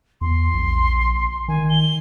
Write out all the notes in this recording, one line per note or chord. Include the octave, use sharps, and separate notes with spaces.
E2 C6
A#1
D#3 G#5
G7